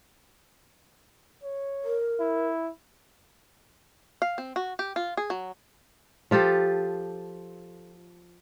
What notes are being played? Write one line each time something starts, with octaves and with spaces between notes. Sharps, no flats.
C#5
A#4
E4
F5
C4
F#4
G4
F4
G#4
F#3
F3 F4 G4 A4